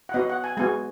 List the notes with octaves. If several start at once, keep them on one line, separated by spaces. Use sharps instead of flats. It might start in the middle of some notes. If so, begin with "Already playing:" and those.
F#5
B3 F#4 D#5
F#5
G#5
G#3 B3 F#4 G#5